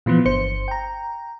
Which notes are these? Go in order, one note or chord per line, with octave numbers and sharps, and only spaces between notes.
A#2 E3 F3 B3
G1 C5 C#7
G5 A#5